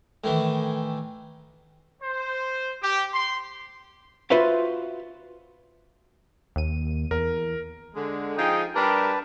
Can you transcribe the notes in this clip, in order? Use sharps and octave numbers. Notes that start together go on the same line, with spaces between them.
A2 D#3 E3
C5
G4
C6
F4 F#4 B4 C5 E5 F5
D#2 D#7
E2 A#4
D3 G#3
F3 D#4 G#4 G5
G3 D4 G4 A#4 B4 A5